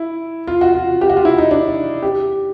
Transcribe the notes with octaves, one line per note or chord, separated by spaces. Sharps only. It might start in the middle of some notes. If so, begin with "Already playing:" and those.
Already playing: E4
F4
F#4
F4
G4
F#4
F4
E4
D#4
D4
G4